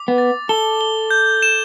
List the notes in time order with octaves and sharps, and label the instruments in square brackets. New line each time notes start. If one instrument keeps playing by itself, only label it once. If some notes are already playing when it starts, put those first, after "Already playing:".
Already playing: [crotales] D6
[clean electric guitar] B3
[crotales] A6
[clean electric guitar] A4 [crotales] G7
[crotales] G7
G6
E7